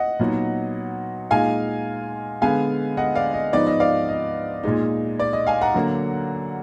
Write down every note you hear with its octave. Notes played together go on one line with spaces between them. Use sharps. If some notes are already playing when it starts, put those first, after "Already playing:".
Already playing: D#5 F#5
A#2 F#3 B3 D#4
A#2 G#3 D#4 F5 G#5
D3 G#3 B3 F5 G#5
D#5 F#5
D5 F5
D#5
G#2 F3 B3 D#4 D5
D#5
D5 F5
D#5
A#2 G#3 D#4
D5
D#5
F5 G#5
F#5 A#5
D3 F#3 A#3